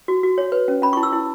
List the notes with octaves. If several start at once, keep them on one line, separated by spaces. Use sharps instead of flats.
F#4
F#4
C#5
B4
C#4
C#4 B5
C#6
E4
E6
E4